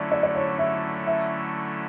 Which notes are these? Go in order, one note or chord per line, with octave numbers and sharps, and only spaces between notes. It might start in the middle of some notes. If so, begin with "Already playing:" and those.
Already playing: D3 F#3 A3 C#4 E4 D5
D5
D5
C#5
E5
E5